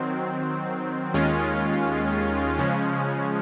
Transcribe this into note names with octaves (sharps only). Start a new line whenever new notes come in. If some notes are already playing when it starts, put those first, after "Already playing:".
Already playing: D#3 F#3 C4
D#2 D#3 G#3 C#4 F4
C#3 F3 G#3 C#4